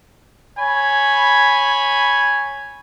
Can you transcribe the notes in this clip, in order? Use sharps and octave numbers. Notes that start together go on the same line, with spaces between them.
C#5 G#5 B5